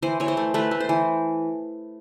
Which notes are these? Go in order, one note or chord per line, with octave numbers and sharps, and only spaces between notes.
E3 C5
E3 C#5
C5
A3
A3 B4
A3
C5
E3